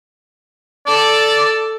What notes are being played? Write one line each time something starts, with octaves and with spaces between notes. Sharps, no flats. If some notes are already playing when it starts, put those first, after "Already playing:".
A4 D5